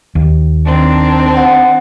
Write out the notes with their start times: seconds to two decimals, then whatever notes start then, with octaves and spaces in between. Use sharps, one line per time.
0.15 D#2
0.66 D#3 C4 D4
1.37 F#5